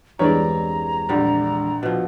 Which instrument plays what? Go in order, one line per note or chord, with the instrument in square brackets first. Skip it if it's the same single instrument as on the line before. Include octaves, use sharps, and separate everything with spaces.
[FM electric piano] E2 E3 G#3 [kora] G2 C4 D5 [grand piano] C#5 [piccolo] A#5
[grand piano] A#1 [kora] D3 G3
[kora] B2 F3